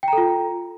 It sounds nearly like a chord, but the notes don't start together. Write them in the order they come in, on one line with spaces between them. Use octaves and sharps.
G5 A#5 A4 F4